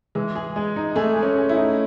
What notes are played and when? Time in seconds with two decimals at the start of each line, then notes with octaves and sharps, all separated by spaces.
0.15 E3 G#3
0.35 G#4
0.56 G#3
0.76 D#4
0.96 A3 G#4
1.16 G#3
1.23 C#4
1.37 G#4
1.49 E4
1.57 D#4